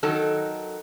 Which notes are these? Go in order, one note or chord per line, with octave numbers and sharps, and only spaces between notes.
D#3 F#3 D#4 A4